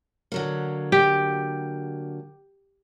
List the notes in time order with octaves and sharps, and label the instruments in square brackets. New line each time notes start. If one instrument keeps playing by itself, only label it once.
[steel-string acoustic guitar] D3 F#3 A#3
[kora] G4